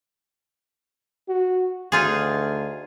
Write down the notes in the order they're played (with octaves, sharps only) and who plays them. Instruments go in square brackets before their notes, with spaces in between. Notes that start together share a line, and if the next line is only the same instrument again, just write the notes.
[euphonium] F#4
[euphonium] D2 [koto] D#4 F4 G#4